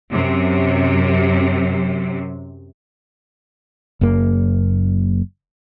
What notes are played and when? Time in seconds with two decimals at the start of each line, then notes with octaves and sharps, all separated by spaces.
0.12 F#2 C3
4.01 F#1 F#2 A#3